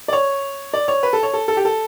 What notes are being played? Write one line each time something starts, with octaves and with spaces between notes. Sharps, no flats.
D5
C#5
D5
C#5
B4
A4
C#5
A4
A4
G4
A4